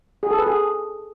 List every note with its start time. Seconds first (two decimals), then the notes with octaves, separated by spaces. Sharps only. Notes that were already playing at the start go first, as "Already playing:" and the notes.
0.23 G#4
0.31 A4
0.39 B4
0.47 G#4